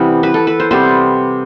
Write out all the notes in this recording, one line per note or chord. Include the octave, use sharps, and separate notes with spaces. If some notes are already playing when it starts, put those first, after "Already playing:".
Already playing: C3 E3 G3 B3
B4
A4
B4
C5
C3 G3 B3 C5